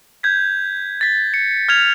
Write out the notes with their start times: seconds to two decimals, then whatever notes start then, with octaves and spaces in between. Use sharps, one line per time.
0.23 G6 G#6 B6
1.01 A6 B6
1.34 C#7
1.69 F6 G#6 A6 F7